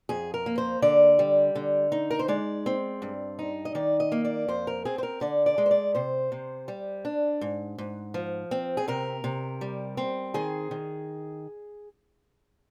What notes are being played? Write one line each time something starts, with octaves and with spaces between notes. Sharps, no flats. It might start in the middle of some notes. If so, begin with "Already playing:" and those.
F2 G#4
A#4
A#3
C5
D3 D5
G3
D3
D#4
A#4
C5
G#3 D5
C4
G2
D#4
D#5
D#3 D5
D#5
A#3
D5
F2 C5
A#4
C4 G#4
C5
A#4
D3 D5
D5
G#3
C5
D5
C3 C5
C3
G3
D4
G#2
G#2
F3
C4
G#4
C3 A#4
C3
G3
C4
D#3 G#4
D#3